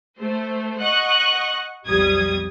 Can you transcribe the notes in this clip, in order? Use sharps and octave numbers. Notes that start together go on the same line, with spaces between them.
A3 C5
D#5 F#5 C#6 F#6
B1 F2 G3 D#6 G#6